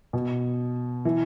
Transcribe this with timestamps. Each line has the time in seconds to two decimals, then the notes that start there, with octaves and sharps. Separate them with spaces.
0.13 B2
1.05 E3